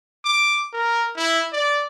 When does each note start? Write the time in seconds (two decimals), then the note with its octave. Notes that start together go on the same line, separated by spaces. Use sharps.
0.25 D6
0.73 A#4
1.17 E4
1.53 D5